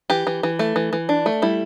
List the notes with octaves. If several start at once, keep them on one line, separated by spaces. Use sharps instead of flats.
E3 G4
E3
E3
A3
E3
E3
D4
A3
G3 E4